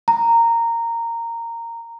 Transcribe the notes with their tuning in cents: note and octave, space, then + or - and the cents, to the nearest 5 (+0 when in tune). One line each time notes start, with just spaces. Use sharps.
A#5 -10